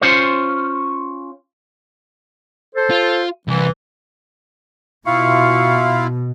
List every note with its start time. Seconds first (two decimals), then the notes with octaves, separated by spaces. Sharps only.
0.01 C#4 F4 C5 C#5
2.75 A4 C5
2.91 F4
3.48 C2 E3
5.06 B2 E4 F4 F5 C#6